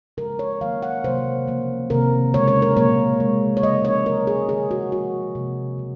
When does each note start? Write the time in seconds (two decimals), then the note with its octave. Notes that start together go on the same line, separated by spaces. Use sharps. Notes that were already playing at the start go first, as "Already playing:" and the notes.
0.17 C#3 F3 G#3 A#4
0.39 C#5
0.61 D#3 F#3 A#3 F5
0.83 F#5
1.04 C3 D#3 F#3 A#3 C5
1.47 C#3 F3 A#3
1.90 C3 D#3 A#3 A#4
2.34 C#3 G#3 C#5
2.48 C#5
2.62 A#4
2.77 A#2 F#3 A#3 C#5
3.20 C#3 G#3
3.57 C#5
3.63 C#3 F3 G#3 D#5
3.85 C#5
4.06 C#3 F#3 A#3 A#4
4.27 G#4
4.49 D#3 G#3 G#4
4.71 F#4
4.92 C#3 F3 G#3 F#4
5.35 C3 F3 A#3
5.78 C#3 F#3